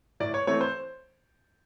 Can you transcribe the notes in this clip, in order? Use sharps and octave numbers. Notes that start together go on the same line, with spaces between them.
A2 D5
C#5
E3 A3 C4 C#5
C5